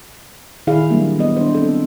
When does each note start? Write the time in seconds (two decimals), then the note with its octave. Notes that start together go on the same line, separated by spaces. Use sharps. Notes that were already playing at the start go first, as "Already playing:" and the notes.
0.67 A#2 D#3 E4 G#4 F5
0.90 F#3 G3 A#3 D4
1.19 B3 D#5
1.37 D4 C5
1.55 C4 A4